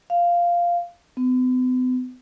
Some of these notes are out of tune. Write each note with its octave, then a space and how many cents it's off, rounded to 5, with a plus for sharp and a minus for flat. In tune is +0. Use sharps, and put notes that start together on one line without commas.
F5 -5
B3 +45